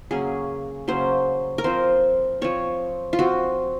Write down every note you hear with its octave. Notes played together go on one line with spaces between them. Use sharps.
C#3 F#3 A#3 C#4 G#4
C#3 F#3 A#3 C#4 C5
A#4
F3 C4 C5
F3 C4 C#5
F4
F3 C4 F#4